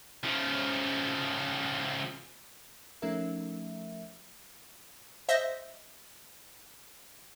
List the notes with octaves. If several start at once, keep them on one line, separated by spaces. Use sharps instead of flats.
C#3 F3
F3 A3 C#4 D#4 A#4 E5
C5 D#5 E5 A#6